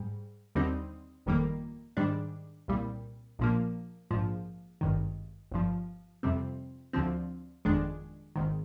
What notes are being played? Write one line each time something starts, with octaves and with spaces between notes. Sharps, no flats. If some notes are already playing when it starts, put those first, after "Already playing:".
Already playing: G#2 G3
D#2 D3 G3 C4 D#4
G1 F2 D#3 G3 A#3
G#2 D#3 G3 D4
C2 A#2 G3
A#1 A#2 F3 A#3
A#1 G#2 F3
G#1 G2 D#3
G1 G2 F3
F2 C3 G3 C4
D2 D3 F3 C4
G1 F2 D#3 G#3 D4
G#1 G#2 D#3